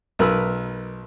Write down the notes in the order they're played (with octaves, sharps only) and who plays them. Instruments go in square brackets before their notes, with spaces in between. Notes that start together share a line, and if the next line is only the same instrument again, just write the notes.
[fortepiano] B1 A#4 B4 E6